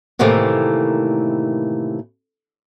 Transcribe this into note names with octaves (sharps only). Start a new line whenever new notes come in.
A2 C3 D#3 E3 A3 A#3